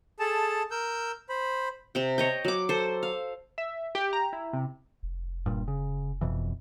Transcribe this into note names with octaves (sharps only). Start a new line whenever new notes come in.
G#4 A4 A5
A#4 E6 G6
C5 B5
C3 G5
C#5 D#5 G5
F#3 D6
A4 C5
F5
E5
G4
A#5
E4
C3
F1
G2 A#2
C#3
F2 B2 E3